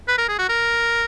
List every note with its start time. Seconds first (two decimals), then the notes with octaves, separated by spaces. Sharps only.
0.08 B4
0.18 A#4
0.28 G#4
0.39 F#4
0.49 A#4